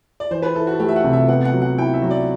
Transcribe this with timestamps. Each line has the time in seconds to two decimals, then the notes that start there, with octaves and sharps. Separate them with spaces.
0.20 D5
0.31 E3 C5
0.42 B4
0.55 E4 A4
0.67 F#4
0.74 A4
0.80 A3 G4
0.89 E5
0.96 F#5
1.04 C3
1.13 E5
1.28 B3 F#5
1.45 F#5
1.53 F#3
1.62 F#5
1.78 E4 G5
1.94 E5
2.02 F#3
2.10 D5